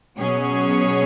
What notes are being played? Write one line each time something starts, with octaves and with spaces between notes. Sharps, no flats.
B2 F#3 C#4 G#4 C#5